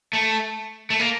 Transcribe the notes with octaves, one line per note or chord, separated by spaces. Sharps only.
A3
A3
A#3